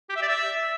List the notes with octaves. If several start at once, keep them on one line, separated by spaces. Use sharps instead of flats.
G4
E5
D5
E5